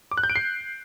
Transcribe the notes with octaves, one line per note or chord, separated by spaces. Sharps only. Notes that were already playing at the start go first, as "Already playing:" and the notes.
D6
F#6
G6
D7
C7